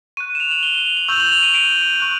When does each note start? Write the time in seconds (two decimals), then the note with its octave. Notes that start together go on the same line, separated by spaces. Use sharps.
0.17 C#6 F#6 D#7
0.35 E7
0.40 F7
0.51 F#7
0.63 G7
0.74 F#7
0.85 F7
0.97 F#7
1.08 C#6 E6 G6 F7
1.20 F#7
1.32 F7
1.43 D#7
1.54 D7
2.00 C#6 F#6